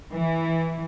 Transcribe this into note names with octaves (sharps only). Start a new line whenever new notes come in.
E3